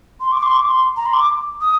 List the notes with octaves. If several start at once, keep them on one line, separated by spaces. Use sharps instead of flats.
C6
D6
C6
D6
C6
A#5
C6
D6
D#6